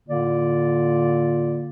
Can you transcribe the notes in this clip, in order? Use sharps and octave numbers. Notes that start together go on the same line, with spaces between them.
A2 D3 A#3 F4 D5